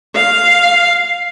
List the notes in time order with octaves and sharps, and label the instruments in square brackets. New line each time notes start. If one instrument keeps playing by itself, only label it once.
[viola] F5